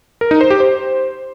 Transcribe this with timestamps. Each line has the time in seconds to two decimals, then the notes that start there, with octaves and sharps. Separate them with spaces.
0.21 A#4
0.31 D#4
0.41 C5
0.50 G4
0.60 C5